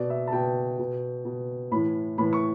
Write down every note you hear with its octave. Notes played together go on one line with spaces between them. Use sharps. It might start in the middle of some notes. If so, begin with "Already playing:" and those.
Already playing: B2 D5
E5
A5
B2 G5
B2
B2
A2 E3 B5
A2 E3 B5
C#6